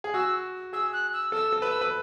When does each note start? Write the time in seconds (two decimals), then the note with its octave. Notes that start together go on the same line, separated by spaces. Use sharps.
0.04 G#4
0.14 F#4 E6
0.73 G#4 E6
0.93 F#6
1.13 E6
1.32 A4 E6
1.52 A4
1.62 B4 E6
1.81 B4